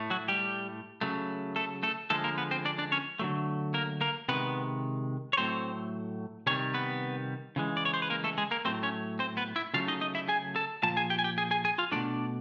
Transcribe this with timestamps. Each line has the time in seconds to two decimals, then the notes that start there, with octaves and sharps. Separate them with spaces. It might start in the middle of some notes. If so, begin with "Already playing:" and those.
Already playing: A2 A3
0.10 F#3 F#4
0.28 G3 G4
1.01 C#3 F#3 A3
1.56 A3 A4
1.83 A3 A4
2.10 D3 F3 G#3 A3 A4
2.24 A#3 A#4
2.38 B3 B4
2.51 C4 C5
2.65 D4 D5
2.78 D4 D5
2.92 C#4 C#5
3.19 D3 F#3 A3
3.74 A#3 A#4
4.01 A#3 A#4
4.29 C3 D#3 G#3 B3 B4
5.33 C#5
5.37 A2 F#3 A3 C4 C5
6.47 C3 D#3 G3 C#4 C#5
6.74 B3 B4
7.56 C#3 E3 G#3
7.77 D5
7.85 C#5
7.94 C5
8.02 B4
8.10 A#3 A#4
8.24 A3 A4
8.38 G#3 G#4
8.51 A#3 A#4
8.65 A2 F#3 A3 C4 C5
8.83 C#4 C#5
9.19 C4 C5
9.37 B3 B4
9.56 E4 E5
9.74 C#3 F#3 A3 F4 F5
9.88 D#4 D#5
10.01 D#4 D#5
10.15 E4 E5
10.28 G#4 G#5
10.56 A4 A5
10.83 A#2 F3 A5
10.97 G#4 G#5
11.10 G4 G5
11.19 G#5
11.24 G4 G5
11.38 G#4 G#5
11.51 G#4 G#5
11.65 G#4 G#5
11.78 F4 F5
11.92 B2 F#3 A3 D4 D5